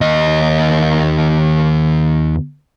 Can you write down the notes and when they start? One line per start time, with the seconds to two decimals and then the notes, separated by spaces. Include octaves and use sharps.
0.01 D#2 D#5